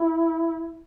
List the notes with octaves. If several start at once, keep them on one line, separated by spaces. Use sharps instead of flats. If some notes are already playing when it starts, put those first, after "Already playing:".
Already playing: E4